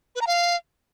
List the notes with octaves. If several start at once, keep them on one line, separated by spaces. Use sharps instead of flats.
B4
A#5
F5